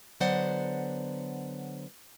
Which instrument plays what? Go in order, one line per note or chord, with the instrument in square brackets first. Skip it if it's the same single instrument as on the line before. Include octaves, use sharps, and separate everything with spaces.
[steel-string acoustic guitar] D3 F#3 B3 C5 D5 F#5